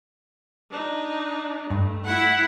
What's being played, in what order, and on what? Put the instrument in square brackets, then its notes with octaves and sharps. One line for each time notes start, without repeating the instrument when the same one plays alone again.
[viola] D4 D#4
[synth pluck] G2 [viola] A3
[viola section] E4 F#5